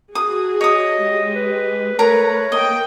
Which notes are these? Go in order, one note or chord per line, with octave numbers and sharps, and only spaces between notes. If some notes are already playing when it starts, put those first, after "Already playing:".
F#4 G#4 D#6
C#5 D#5 D#6
G#3 G4
B4
A3 A#4 B4 C#5 A#5
A#3 D#5 G5